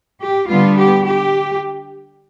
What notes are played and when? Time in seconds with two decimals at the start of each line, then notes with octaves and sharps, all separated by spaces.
0.20 G4
0.48 D3 G3 B3 F4
0.76 G4
1.04 G4